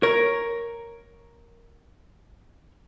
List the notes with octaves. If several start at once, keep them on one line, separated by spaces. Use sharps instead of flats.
A#4 C#5